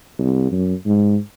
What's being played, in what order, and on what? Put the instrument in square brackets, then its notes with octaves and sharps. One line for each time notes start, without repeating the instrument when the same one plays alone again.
[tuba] C2
F#2
G#2